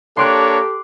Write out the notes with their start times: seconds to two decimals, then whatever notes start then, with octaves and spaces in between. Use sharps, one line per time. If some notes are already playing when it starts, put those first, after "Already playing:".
0.17 A#3 D4 G4 A4 C#5 C6 D6 F#6